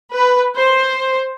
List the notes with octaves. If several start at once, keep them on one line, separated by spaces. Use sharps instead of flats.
B4
C5